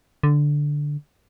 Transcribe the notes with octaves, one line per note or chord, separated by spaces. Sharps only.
D3